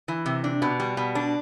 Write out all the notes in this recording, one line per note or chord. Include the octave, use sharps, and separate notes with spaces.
E3
C3
D4
B2
G3
B2
D4